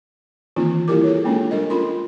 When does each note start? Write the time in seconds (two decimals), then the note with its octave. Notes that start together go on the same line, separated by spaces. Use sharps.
0.56 D#3 E3 A#3 C4 D#4 F4
0.88 G3 A#3 E4 G4 A#4 D6
1.03 F4 G#4 A4 C#5
1.24 G#3 A#3 C#4 D4 A4
1.51 G3 D4 A#4 D#5
1.70 C#4 F4 A#4 B5 C6